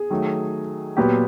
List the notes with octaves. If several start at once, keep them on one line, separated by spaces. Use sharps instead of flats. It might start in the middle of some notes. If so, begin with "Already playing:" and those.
Already playing: G#4
D#3 F#3 A3
A#2 F#3 B3 G4